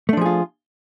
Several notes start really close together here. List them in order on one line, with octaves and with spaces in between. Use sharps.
A3 D4 F3 G#4 F4